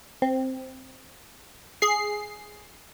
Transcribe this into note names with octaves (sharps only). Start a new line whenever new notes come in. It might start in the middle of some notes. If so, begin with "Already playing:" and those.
C4
G#4 C7